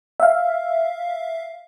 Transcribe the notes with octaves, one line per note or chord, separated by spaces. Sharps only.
E5 F5